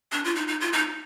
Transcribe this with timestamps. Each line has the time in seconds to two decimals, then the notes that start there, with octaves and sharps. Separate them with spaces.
0.12 D4
0.24 F4
0.36 D#4
0.47 D#4
0.61 F4
0.73 D#4